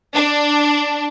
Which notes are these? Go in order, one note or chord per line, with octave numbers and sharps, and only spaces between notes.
D4